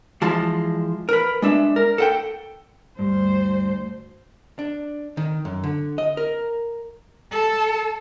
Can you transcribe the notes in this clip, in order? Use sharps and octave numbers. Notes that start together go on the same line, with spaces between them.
E3 F3 G#3 A5
A#4 B4
G#3 D4 E5
A#4
A4 F#5 G5
D2 G2 C5
D4
D#3
F#2
D3
D#5
A#4
A4